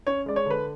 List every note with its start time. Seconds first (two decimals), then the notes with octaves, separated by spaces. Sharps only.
0.07 C#4 C#5
0.26 G#3 D5
0.36 C#5
0.46 D3 B4